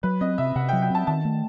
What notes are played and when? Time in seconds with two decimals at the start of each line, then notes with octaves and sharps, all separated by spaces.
0.03 F#3 B4
0.21 C4 D#5
0.38 C3 E5
0.56 C3 F#5
0.69 F#3 G5
0.82 G5
0.90 C4 A5
1.07 D#3 A5
1.25 A3